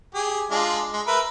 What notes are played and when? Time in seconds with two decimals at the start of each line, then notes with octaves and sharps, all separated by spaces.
0.15 G4 G#4
0.51 G#3 D4 F4
0.93 G#3
1.07 A#4 B4 E5